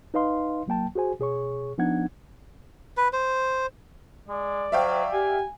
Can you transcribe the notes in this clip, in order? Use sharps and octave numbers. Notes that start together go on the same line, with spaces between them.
D#4 B4 D#5 F5 C6
C2 F#3 A#3 G5 A5
F#4 G#4 C5 G#5
B2 G#4 C#5 C#6
F3 B3 D4 D#4 F#5 G#6
B4
C5
G#3 D5
F#3 C5 E5 F5 G5
G4 G#5